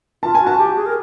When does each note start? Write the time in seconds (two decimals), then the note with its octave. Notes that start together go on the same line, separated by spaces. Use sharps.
0.23 F4 A5
0.35 G#5
0.41 F#4
0.47 A5
0.57 G4
0.76 G#4
0.86 A#4